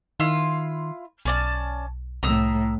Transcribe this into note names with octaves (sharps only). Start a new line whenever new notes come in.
D#3 E4 F4 C6
B1 C#4 D5 A5
C2 A2 A#5 D#6 E6